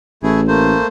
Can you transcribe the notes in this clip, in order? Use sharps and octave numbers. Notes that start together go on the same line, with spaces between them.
A1 A3 E4 G#4
A3 A#3 C5